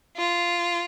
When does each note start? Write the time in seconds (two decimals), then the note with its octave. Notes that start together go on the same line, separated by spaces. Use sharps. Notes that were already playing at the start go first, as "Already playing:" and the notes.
0.16 F4